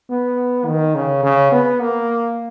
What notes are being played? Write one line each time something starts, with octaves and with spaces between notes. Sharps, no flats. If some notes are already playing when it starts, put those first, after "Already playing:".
B3
D#3
C#3
C#3
B3
A#3